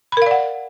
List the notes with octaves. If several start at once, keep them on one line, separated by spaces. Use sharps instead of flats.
A#4 D5 F5 F#5 B5